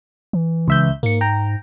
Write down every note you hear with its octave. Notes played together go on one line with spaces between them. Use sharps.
E3
C#2 E5 G6
G#2 A#3 C#7
G5 A#5